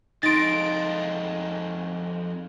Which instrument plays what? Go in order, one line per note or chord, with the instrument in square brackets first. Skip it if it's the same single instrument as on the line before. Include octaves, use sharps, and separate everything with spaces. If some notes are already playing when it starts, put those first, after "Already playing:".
[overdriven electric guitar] F2 G#3 [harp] D#4 C6 [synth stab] A6 D7